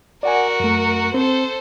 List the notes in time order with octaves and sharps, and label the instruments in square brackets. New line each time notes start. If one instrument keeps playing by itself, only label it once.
[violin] F#4 A#4 [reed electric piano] D5 F#5 G#5
[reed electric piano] F#2 A3
[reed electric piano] C4 [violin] A4 C5